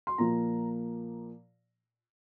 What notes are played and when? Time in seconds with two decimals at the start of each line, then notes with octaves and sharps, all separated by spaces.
0.07 C6
0.18 A#2 F3 A#3 A#5